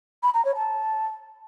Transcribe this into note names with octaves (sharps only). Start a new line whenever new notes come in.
B5
A#5
C#5
A5